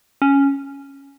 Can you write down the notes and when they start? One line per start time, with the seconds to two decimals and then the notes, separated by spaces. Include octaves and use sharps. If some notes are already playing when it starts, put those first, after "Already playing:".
0.22 C#4